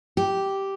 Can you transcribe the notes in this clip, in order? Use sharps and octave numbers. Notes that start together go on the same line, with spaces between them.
G4